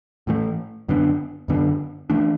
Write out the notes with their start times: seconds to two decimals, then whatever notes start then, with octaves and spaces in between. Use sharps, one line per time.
0.27 A2 E3 A3
0.88 F#2 D3 B3 D4
1.48 F#2 D3 B3 D4
2.10 E3 A3 D4